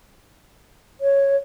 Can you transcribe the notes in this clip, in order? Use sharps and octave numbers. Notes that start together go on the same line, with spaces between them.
C#5